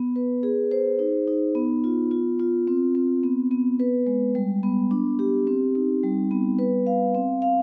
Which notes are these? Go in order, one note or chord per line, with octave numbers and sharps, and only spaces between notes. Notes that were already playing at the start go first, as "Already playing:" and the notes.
Already playing: B3
B4
G#4
C5
D#4
D#4
B3
F4
F4
F4
C4
C4
B3
B3
B4
G#3
G3
B3
D4
G4
C4
D#4
G3
B3
B4
F5
C4
F5